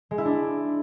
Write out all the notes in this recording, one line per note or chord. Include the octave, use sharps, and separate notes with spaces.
G#3
E4
D4